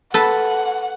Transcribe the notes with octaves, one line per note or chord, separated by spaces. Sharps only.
A4 B4 F#5